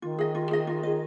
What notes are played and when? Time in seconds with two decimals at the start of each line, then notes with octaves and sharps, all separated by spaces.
0.02 D#3 F4
0.19 G#4 D#5
0.35 F4
0.51 G#4 D#5
0.67 F4
0.83 G#4 D#5